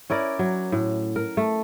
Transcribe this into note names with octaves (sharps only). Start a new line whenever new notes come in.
C#4 E4 A#4 D5
F#3
A2
A#4
A3